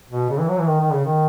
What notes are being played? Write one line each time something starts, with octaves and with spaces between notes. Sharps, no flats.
B2
C#3
E3
F#3
E3
D#3
D#3
C#3
D#3